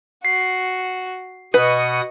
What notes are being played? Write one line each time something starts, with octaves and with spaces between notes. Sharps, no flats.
F#4 C7
B2 B4 D#5 F#5 C#6 D#6